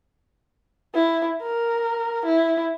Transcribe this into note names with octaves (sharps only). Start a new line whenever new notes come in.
E4
A#4
E4